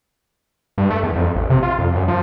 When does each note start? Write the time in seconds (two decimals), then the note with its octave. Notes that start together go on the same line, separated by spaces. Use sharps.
0.78 G2
0.90 A3
1.03 E2
1.16 F2
1.36 A1
1.50 C3
1.63 F4
1.79 F2
1.95 F#2
2.08 F3